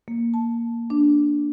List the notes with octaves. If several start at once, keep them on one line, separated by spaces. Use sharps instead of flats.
A#3
A5
D4